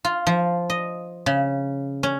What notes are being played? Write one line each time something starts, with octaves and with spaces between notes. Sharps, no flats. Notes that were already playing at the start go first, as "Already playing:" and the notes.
F4
F3
D#5
C#3
C#4